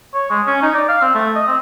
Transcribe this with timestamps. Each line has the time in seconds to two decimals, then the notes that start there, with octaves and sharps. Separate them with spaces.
0.14 C#5
0.30 G#3
0.47 C#4
0.63 D#4
0.74 D5
0.88 F5
1.02 C4
1.15 A3
1.36 D#5
1.48 C4